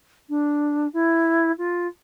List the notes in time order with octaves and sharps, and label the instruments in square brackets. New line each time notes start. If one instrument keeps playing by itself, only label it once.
[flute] D4
E4
F4